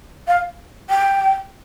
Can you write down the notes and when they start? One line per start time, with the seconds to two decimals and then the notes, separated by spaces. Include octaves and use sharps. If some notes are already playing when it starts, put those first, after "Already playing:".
0.28 F5
0.90 G5